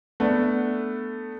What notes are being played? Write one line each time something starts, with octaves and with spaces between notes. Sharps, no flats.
A3 B3 D4